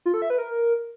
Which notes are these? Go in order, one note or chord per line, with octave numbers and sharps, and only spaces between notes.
F4
A4
E5
B4
A#4